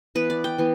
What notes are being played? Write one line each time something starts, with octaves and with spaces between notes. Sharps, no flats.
E3 B3 B4
D5
G5
E3 B3